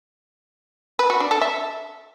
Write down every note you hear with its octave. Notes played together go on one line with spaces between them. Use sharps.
B4
F#4
D4
A4
E5